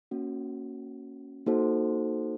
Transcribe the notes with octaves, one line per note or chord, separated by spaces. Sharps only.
A#3 C#4 F#4
A#3 D#4 F#4 A4 C5